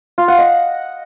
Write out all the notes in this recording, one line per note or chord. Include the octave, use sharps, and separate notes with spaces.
F4
F#5
D#5